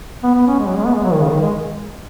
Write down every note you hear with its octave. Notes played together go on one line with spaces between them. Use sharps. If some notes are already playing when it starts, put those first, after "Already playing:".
B3
B3
C#4
G#3
F#3
G#3
B3
G#3
F#3
D#3
C#3
D#3
G#3